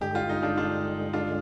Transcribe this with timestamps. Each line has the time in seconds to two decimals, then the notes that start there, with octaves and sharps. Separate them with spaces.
0.01 G2 D3 G#3 G4
0.15 F4
0.29 D#4
0.43 D4 F4
0.57 D4 F4
1.13 D4 F4